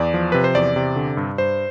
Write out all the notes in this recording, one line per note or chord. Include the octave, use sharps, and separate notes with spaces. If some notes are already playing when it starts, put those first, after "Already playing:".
Already playing: E2 D5
F3
C3 B4
C5
E2 D5
C3
D3
G2
G2 C5